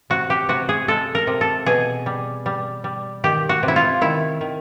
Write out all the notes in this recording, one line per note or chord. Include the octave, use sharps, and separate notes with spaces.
C3 F#4
G4
C3 F#4
G#4
G#3 A4
A#4
C3
A4
B2 G#4
G3
G3
G3
D#3 G4
F#4
C3
E4
F4
D#3 E4
D#3